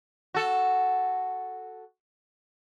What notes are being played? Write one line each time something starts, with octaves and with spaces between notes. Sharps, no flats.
F#4 A4